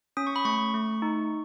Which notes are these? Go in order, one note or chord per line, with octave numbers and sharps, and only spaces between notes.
C#4 D#6
C#6
B5
A3 C#6
A3
D#4